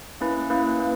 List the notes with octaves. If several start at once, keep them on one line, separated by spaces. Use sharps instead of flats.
A#3 C#4 E4 B4
A#3 C#4 E4 B4
A#3